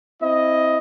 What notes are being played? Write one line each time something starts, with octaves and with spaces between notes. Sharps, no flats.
C4 E4 D#5